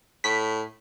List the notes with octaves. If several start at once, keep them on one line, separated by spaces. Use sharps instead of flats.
A2 B6